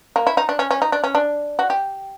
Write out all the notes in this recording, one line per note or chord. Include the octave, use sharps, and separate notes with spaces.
A#3
E4
D#4
D4
C#4
C#4
D#4
D4
C#4
D4
F#4
G4